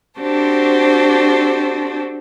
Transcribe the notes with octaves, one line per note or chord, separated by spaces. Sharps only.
C4 D4 F#4 G4 A4 C5